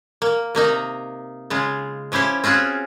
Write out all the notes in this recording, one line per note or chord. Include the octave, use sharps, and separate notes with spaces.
A#3
C3 A#3 D#4 A#5
C#3 G#3 F4
F3 C#4 E4 G4 C5
C4 C#4 F4 F#4 G#4